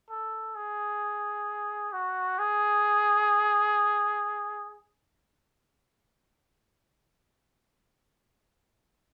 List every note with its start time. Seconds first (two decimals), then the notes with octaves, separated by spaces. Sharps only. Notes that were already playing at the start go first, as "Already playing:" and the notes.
0.11 A4
0.56 G#4
1.93 F#4
2.39 G#4